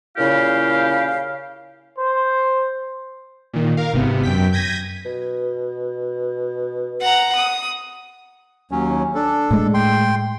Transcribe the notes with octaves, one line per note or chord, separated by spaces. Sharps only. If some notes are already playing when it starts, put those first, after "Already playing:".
A#2 C#3 E4 G4 F5
C5
A#2 D#3
A#4 F5
G#1 C3 B3
F#2 G5 B6
G6 G#6 A#6 B6 D#7
B2
F#5 A#5
D#6
D#2 F#3 C#4
D4 A4
A2 G#3
G5 C6